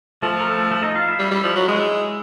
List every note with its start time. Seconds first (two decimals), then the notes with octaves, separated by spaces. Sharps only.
0.23 F3 A3 A4
0.40 A#4
0.47 A3 A4
0.71 A3 A4
0.82 D#4 D#5
0.94 F4 F5
1.07 E4 E5
1.19 G3
1.31 G3
1.43 F3
1.56 F#3
1.68 G#3